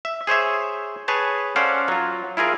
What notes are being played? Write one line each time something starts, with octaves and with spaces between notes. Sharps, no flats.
E5
G#4 C5 C#5 E5
G#4 B4 C#5 A5
C#4 A4 C5 D5 F5 F#5
F#3 F4
E4 F4 G#4 A#4 F5